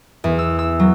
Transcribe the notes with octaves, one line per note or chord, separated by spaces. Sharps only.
E2
E6
E6
F#3